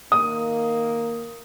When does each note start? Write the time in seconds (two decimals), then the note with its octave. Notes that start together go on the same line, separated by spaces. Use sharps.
0.12 D#3 A#3 D#6